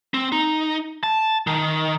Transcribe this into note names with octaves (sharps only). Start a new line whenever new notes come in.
C4
D#4
A5
D#3